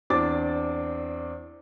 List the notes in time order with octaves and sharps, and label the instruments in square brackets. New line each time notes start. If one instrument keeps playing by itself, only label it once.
[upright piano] E2 C4 D4 D6 A6